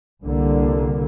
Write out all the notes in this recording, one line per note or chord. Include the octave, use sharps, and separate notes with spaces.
C2 D3 A#3